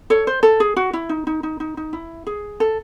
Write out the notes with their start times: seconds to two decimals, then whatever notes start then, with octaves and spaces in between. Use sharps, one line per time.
0.10 A4 C#5
0.27 C5
0.43 A4
0.60 G#4
0.76 F#4
0.93 E4
1.09 D#4
1.27 D#4
1.43 D#4
1.60 D#4
1.77 D#4
1.93 E4
2.27 G#4
2.60 A4